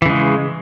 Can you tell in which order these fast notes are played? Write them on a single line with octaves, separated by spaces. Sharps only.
E3 C#3 G#3